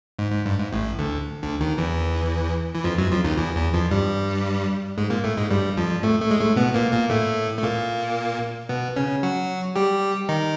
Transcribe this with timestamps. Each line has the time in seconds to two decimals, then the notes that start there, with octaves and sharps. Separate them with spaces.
0.19 G#2
0.32 G#2
0.46 G2
0.58 G#2
0.72 A1 A2
0.99 D2 D3
1.43 D2 D3
1.60 D#2 D#3
1.78 E2 E3
2.75 E3
2.84 F2 F3
2.98 F#2 F#3
3.11 F2 F3
3.24 D#2 D#3
3.38 E2 E3
3.56 E2 E3
3.74 F2 F3
3.91 G2 G3
4.98 G#2 G#3
5.10 A#2 A#3
5.24 A2 A3
5.37 G#2 G#3
5.50 G2 G3
5.77 F2 F3
6.03 A2 A3
6.21 A2 A3
6.31 G#3
6.40 A2 A3
6.56 B2 B3
6.74 A#2 A#3
6.92 A#2 A#3
7.10 A2 A3
7.59 A3
7.63 A#2 A#3
8.69 B2 B3
8.96 C#3 C#4
9.23 F#3 F#4
9.76 G3 G4
10.29 D#3 D#4